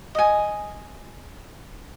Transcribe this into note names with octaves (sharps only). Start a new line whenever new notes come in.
D#5 G#5